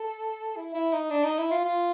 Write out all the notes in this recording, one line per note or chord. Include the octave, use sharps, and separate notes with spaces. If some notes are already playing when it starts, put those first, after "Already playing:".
Already playing: A4
E4
E4
D#4
D4
D#4
E4
F4
F4